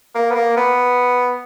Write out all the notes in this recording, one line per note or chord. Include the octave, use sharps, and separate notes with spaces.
A#3
B3
A#3
B3